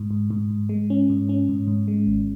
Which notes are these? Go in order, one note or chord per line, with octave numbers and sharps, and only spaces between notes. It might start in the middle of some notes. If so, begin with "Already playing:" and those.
Already playing: G#2
G#2
G#2
G#2
G#3
C#4
G#2
C#4
G#2
G#2
G#3
G#1